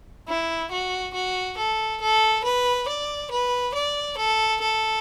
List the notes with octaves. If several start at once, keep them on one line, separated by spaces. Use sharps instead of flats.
E4
F#4
F#4
A4
A4
B4
D5
B4
D5
A4
A4